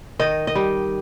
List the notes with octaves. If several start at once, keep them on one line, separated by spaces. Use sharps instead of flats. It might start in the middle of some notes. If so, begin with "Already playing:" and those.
D#3 D#5
D#5
G3